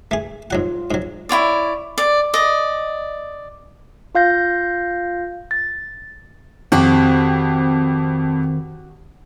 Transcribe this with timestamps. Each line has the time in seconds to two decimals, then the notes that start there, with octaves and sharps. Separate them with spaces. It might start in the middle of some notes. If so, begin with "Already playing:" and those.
0.11 A3 G#4
0.50 G#2 F#3 F4 F#5
0.91 G#2 F#3
1.29 E4 F4 C#5 D5
1.98 D5
2.34 D5 D#5
4.15 F4 F5 G6 A#6
5.51 A6
6.72 F2 D#3 C4 F#4 G4